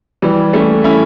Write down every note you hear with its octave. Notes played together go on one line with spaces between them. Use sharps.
E3 G3
A3 C#4
C#4 E4